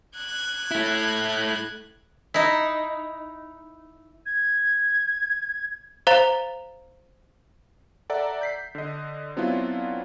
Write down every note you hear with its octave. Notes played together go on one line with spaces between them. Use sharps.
F#6 G#6
A3 E4
D#4 E4
G#6
C5 F5 A#5 A6 F7 G7
A4 D5 E5 F#5 A#5
G6 B6 C7
D3 D#5
F#3 B3 C4 D4 E4 F4